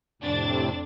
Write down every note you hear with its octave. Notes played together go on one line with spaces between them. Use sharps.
F2 A2 C3 D4 A6